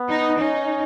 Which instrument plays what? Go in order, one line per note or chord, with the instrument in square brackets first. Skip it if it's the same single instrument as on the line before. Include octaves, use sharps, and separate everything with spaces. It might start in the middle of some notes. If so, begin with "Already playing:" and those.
Already playing: [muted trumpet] B3
[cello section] D#4
[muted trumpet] C#4 [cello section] D#4